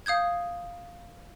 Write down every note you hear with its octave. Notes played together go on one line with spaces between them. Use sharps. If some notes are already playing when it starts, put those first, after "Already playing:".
F5 D#6 G6 G#6